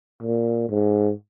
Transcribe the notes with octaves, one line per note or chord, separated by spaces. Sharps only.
A#2
G#2